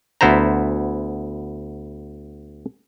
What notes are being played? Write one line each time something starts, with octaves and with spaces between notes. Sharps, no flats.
D2 B3 E4 C5 A#5